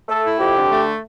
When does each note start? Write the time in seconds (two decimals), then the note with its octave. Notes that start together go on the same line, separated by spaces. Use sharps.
0.08 A3 A4
0.24 E4
0.39 F2 G4
0.55 D3
0.70 A3